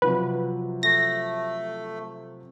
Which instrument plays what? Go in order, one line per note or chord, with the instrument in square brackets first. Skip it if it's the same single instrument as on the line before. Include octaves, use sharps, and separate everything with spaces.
[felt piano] C3 F3 F#3 [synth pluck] B4
[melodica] A3 [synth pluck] A#6